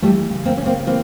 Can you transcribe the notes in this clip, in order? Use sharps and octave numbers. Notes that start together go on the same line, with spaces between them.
E3 G3 A3
C#3
A#3 C4
C#3 C#4
A#3 C4
E3 A#3 C4